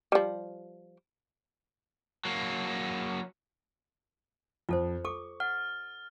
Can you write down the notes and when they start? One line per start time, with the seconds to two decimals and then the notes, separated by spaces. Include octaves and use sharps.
0.12 F3 G3
2.25 F#3 A#3
4.69 F2 F4 A4 C5
5.05 A4 C#6 D6
5.40 F#5 F6 A6